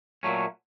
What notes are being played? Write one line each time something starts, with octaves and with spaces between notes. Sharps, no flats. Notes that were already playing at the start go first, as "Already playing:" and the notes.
A#2 F#3 A3 C#4